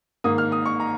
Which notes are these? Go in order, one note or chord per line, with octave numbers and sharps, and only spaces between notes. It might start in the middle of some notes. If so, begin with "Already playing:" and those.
G#2 D#3 A#3 D#6
F6
D#6
C#6
A#5